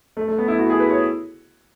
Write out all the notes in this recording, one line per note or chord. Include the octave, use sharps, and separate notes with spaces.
A3
A3
B3
E4
F#4
G#4
B4
C#5